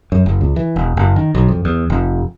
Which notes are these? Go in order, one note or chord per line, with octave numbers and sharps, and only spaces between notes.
F#2
F#1
C#2
E3
E1
F#1
D#3
B1
F2
E2
F1